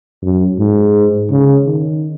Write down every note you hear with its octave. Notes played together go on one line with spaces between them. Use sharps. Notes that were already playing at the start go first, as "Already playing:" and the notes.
F#2
G#2
C#3
D#3